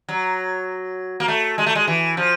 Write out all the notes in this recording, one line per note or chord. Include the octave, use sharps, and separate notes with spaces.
F#3
A#3
A3
G#3
A3
G#3
E3
F3